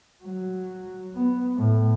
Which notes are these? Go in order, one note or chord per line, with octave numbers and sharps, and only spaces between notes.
F#3
B3
A2